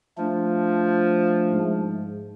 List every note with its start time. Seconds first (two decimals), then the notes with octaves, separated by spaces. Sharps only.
0.18 F3 A3 D4
1.52 G#2